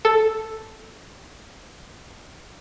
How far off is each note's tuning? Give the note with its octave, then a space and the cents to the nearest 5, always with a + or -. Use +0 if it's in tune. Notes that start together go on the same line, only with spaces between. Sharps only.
A4 +0